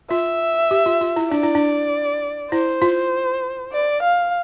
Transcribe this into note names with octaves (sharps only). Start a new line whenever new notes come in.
F4 E5
G4
F4
F4
E4
D4 D5
E4
D4
E4 C5
F4
D5
F5